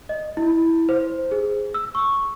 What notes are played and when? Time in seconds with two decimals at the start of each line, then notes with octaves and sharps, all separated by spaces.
0.09 D#5
0.37 E4
0.89 C5
1.31 G#4
1.74 E6
1.95 C#6